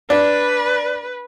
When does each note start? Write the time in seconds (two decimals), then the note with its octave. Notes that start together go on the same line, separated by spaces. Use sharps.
0.10 D4 B4